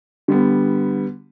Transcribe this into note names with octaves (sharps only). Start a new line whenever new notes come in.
D3 G3 B3